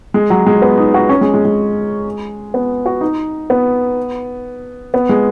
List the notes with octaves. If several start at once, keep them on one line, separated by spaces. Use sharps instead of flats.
G#3
F#3
G#3
B3
D#4
F#4
C#4
G#3
G#3
G#3
B3
F#4
D#4
B3
B3
G#3